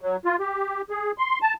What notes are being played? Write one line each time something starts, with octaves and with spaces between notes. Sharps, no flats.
F#3
F4
G4
G#4
C6
A5